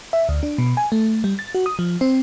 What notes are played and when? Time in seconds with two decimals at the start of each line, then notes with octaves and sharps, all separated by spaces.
0.13 E5
0.29 D2
0.43 D4
0.58 B2
0.77 G#5
0.92 A3
1.24 G3
1.39 A6
1.55 F#4
1.66 D#6
1.79 F3
2.01 C4